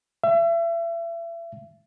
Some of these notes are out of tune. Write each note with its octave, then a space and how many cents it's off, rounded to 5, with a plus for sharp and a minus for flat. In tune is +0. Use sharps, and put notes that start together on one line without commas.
E5 +35